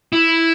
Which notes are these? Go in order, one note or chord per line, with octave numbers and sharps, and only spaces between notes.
E4